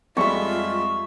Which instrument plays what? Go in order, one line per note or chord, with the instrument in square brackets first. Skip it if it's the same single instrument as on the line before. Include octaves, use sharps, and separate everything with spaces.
[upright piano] F2 G3 G#3 [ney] F4 [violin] E5 [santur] B5 C#6